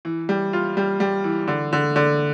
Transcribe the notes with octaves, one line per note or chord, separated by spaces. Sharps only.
E3
G3
F4
G3
G3
E3
D3
D3
D3